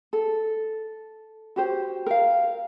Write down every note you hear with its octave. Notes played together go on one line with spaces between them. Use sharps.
A4
F#4 G4 C5
A#4 F5